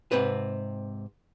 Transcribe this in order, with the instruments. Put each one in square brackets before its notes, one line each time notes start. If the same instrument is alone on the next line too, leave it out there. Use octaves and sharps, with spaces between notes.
[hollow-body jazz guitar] G#2 C3 C4 B4